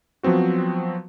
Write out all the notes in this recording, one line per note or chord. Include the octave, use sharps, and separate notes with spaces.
F3 F#3 B3 C4 F#4